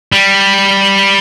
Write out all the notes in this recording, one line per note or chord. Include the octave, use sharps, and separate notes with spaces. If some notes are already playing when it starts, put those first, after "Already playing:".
G3